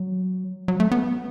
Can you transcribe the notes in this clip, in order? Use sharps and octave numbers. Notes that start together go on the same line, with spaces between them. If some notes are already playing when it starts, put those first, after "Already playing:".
Already playing: F#3
F#3
A3
B3